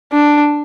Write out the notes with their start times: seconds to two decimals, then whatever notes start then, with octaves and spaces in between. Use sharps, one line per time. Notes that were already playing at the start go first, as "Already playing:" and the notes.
0.12 D4